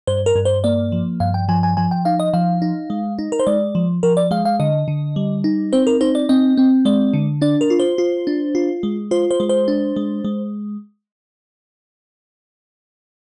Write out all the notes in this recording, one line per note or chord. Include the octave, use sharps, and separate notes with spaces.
G2 C5
A#4
G2
C5
A#3 D5
F3
G2 F5
G5
F3 G#5
G#5
F3 G#5
G5
D#4 F5
D#5
F3 F5
D#4
G#3
D#4
A#4
C5
G#3 D5
F3
F3 A#4
D5
G#3 F5
F5
D3 D#5
D3
G3
D#4
C4 C5
A#4
D#4 C5
D5
C4 D#5
C4
G#3 D5
D3
D4 D5
A#4
F4
C5
F4
D4
F4
G#3
F4 C5
C5
G#3
C5
D4
G#3
G#3